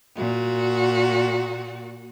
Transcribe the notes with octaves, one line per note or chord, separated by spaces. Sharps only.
A#2 F#4